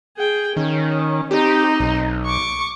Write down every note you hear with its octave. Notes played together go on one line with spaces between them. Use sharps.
G#4 G5
D#3 C#4
C4 D#4 G4
B1
C#6 D6